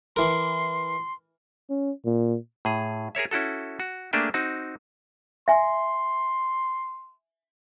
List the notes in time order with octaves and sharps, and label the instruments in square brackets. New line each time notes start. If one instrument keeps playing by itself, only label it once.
[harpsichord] E3 A#4 [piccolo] C6
[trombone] C#4
A#2
[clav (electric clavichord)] A2 G#4
G#4 A#4 C#5 E5
C#4 E4 F#4 A4
F#4
A3 A#3 D4 G#4 E5 G5
C4 D#4 F#4
[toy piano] E5 G#5 [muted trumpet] C6